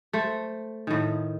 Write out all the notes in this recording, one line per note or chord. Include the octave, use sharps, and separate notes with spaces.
A3 C5
A2 D#3